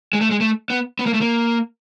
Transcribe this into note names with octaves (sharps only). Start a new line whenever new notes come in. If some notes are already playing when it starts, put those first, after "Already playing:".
G#3
A3
G#3
A3
B3
B3
A#3
A3
A#3